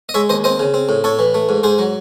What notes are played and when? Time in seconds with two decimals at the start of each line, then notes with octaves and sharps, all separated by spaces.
0.09 D#5
0.14 G#3 C#5 E5
0.29 D#2 C5 D#5
0.44 C4 C5 D#5
0.59 C#3
0.74 C4
0.89 A2
1.04 A2 A4 C#5
1.19 E3
1.34 A3
1.49 G#2
1.63 G#2 G#4 C5
1.79 F#3